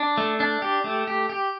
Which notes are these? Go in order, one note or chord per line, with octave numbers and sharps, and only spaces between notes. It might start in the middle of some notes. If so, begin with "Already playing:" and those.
Already playing: D4
A3
D4
G4
A3
G4
G4